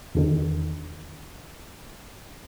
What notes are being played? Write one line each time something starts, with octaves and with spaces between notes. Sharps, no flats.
E2 D3 D#3